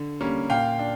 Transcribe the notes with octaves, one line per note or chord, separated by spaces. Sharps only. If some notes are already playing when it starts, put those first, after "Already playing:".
Already playing: D3
G3 A#3 C#4
A#2 F5 G5
D4